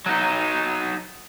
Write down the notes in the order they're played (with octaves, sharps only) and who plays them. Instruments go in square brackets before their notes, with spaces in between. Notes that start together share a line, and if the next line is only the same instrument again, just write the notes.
[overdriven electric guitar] F#3 D#4